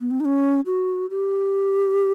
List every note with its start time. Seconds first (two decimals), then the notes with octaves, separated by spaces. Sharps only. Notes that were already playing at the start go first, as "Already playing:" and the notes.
0.01 B3
0.11 C4
0.20 D#4
0.25 C#4
0.66 F#4
1.10 G4